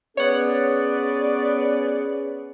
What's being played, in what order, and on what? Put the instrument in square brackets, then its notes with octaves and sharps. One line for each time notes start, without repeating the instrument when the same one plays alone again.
[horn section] B3 [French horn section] C#4 G#4 [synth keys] C#5 F#5 [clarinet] D5